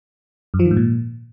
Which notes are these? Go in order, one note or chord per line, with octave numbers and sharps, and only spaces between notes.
F#2
F3
D#3
G#2
A#2